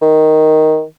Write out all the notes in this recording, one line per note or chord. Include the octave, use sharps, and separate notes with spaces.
D#3